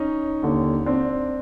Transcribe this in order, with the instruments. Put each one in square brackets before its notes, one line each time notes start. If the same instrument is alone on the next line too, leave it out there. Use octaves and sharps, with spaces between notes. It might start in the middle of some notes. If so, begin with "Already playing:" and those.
Already playing: [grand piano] C#4 D#4
D#2 D3
C4 D4